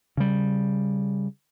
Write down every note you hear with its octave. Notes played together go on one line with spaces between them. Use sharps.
C#3 G3